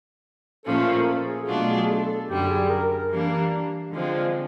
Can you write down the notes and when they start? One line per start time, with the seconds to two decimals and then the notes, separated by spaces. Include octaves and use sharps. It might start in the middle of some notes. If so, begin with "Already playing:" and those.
0.66 A#2 F3 A3 C#4 A4
0.86 A#4
1.07 A4
1.27 G#4
1.47 B2 F#3 A3 D4 F4 F#4
1.68 G#4
1.89 A4
2.08 A4
2.29 F#2 D3 G3 G4
2.50 G#4
2.69 A#4
2.91 A#4
3.11 E3 G3 A#3 D4
3.92 D3 F3 G#3 C4